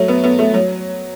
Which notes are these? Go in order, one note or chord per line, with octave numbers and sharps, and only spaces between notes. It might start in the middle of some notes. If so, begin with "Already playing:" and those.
Already playing: F#3 A3
B3
B3
A3
F#3